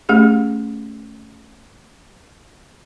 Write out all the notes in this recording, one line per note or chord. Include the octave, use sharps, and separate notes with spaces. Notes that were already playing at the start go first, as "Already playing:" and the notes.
A3 C#4 G4 G#4